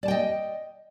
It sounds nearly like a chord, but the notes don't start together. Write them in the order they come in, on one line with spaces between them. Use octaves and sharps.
D5 A5 G5 D#5